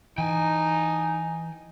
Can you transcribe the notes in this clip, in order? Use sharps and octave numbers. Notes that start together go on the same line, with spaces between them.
E3 D#4 G5 G#5